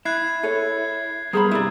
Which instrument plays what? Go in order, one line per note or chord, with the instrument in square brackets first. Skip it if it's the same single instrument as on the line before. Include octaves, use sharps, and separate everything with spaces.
[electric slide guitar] E4 [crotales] F#6 G#6 C7
[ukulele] A4 C#5
[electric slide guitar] G3 B3 A#4 [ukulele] G#4 C5 B5
[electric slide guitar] G2 C3 [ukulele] E4 D5